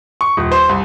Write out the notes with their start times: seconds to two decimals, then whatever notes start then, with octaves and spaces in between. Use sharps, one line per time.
0.21 C#6
0.37 D#1
0.52 C5
0.69 C2